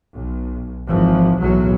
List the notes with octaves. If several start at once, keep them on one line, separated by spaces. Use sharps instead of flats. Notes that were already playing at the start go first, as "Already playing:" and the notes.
B1
G#1 E3 F3
B1 E2 A2 F#3